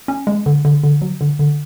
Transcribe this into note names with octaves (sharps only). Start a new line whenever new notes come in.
C#4
G#3
D3
D3
D3
F#3
D3
D3